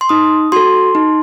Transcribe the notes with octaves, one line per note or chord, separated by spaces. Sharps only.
C6
D#4 D#6
F#4 A4 C6
D#4